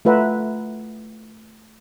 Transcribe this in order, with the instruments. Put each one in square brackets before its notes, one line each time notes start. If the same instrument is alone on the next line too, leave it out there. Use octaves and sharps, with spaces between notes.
[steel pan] A3 F4 B4 E5 F#5 A#5